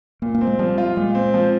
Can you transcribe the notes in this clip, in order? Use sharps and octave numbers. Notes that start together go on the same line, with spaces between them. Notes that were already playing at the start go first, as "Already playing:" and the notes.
A#2 A#3
A#3
C4
G#3
F3 G3
F4
A#2 G#3
C4
F3